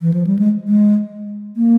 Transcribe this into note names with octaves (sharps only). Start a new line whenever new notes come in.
E3
F3
G3
G#3
G#3
A#3